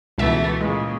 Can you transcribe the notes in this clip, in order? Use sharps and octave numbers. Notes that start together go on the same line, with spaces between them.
C#2 B2 E3 A3 B3 E5
A#2 C#3 G#3